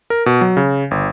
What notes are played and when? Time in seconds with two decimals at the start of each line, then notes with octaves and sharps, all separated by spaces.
0.10 A#4
0.26 B2
0.41 F#3
0.57 C#3
0.91 G1